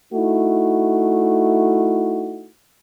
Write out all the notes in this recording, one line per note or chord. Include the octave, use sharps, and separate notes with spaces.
A3 D#4 E4 F#4